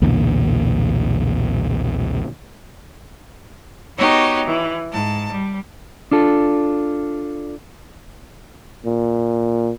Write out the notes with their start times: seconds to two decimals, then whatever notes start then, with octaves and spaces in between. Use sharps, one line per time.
0.02 B1 E2 A#2 D3
3.97 B3 D#4 F#4 G4 C#5
4.46 E3
4.91 G#2 A5
5.32 G3
6.11 D4 F4 A4
8.86 A#2